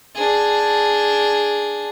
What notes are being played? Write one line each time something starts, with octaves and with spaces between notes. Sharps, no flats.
D4 G#4